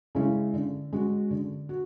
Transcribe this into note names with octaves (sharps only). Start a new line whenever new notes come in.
C#3 G#3 C#4 E4
D3
G#3 C#4 F#4
D3
F#4